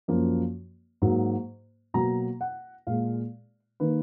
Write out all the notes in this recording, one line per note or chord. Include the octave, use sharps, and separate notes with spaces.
F#2 F3 A#3
G#2 F#3 A#3
B2 F#3 A#3 A#5
F#5
A#2 G#3 F5
D#3 A#3 B4